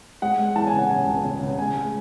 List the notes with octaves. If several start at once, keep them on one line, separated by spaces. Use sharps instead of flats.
G#3 F#5
G#3
E3 A5
G#5
C#3
F#5
C#3 G#5
C#2
C#2
C#3
G#3 G#5
G#3